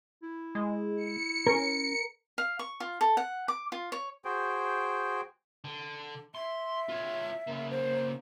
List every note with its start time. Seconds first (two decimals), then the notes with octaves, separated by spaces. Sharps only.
0.23 E4
0.55 G#3
0.96 C#7
1.47 C#4 A#4
2.38 F5
2.59 C#6
2.80 F4
3.01 A4
3.17 F#5
3.48 D6
3.72 F4
3.92 C#5
4.25 F#4 G#4 C5 G5
5.64 D3
6.35 E5 C6
6.89 F4 C#5
7.47 C#3 A#3
7.70 C5